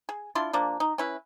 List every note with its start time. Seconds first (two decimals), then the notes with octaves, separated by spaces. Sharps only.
0.09 G#4
0.35 D4 E4 F4 C6
0.53 F3 A#3 D4
0.80 D#4
0.98 C#4 E4 B4